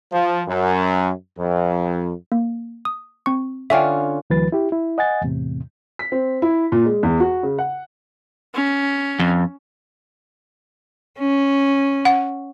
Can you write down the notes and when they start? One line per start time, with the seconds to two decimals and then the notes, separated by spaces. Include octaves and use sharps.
0.12 F3
0.47 F#2
1.37 F2
2.32 A#3
2.85 D#6
3.26 C4 C#6
3.70 D3 C#4 F4 E5 G5
4.30 D2 E3 F#3 B4 A6
4.52 E4 G4
4.72 E4
4.98 D#5 F#5 G#5 A6
5.22 E2 A2 C3
5.99 B6
6.12 C4
6.42 E4
6.72 A#2
6.85 G#3
7.03 E2
7.20 F#4
7.43 C#3
7.59 F#5
8.55 C#4
9.19 F2
11.19 C#4
12.05 F#5